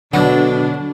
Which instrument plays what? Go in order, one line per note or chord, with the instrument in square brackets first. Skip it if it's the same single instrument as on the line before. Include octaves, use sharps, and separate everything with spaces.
[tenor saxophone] B2 [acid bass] D3 [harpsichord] F#3 B3 [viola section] D4